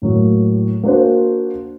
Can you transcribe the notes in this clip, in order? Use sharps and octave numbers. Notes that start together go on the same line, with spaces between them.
A2 F#3 A#3
A#3 D4 F#4 C5